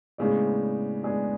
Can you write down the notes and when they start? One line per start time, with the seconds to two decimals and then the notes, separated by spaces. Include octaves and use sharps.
0.18 A2 C#3 G#3 B3 D4 G#4 D5
1.03 G#3 B3 D4 G#4 D5